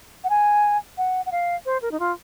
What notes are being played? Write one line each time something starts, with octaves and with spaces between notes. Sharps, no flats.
F#5
G#5
F#5
F#5
F5
C5
A#4
D#4
F4